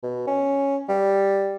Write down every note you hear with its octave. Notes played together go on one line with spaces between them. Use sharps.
B2
C#4
G3